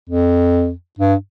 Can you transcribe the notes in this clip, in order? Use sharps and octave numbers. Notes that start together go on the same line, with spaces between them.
F2
G2